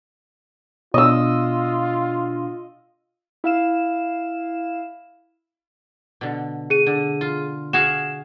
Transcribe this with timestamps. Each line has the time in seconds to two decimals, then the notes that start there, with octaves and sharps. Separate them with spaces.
0.94 B2 D4 F4 D#5 E6
3.44 E4 F5 E7
6.21 B2 D3
6.70 G#4 D#7
6.87 D3
7.21 F4
7.73 F#4 G#4 F5 E7